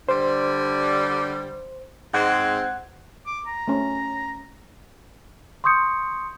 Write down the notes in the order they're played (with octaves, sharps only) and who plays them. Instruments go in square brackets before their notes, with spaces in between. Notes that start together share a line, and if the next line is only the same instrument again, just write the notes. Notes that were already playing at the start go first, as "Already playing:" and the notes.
[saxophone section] D3 G3 [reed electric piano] C5
[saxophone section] G#2 G#3 C4 [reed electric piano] F#5 F#6 G#6
[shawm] D6
A#5
[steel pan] A3 C#4
[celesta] C6 C#6 D#6 G6 C#7